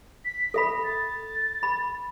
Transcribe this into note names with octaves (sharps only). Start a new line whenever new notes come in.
B6
A4 E5 B5
A6
B5